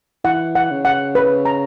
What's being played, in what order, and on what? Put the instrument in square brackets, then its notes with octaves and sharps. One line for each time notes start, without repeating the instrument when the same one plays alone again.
[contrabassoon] E3 [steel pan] F#5
[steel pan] F#5
[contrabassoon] C#3
[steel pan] F#5
B4
A#5